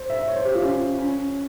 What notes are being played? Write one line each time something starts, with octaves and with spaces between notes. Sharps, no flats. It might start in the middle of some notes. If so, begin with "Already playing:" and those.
Already playing: C5
E5
C#5
C5
G4
F4
C#4
C#4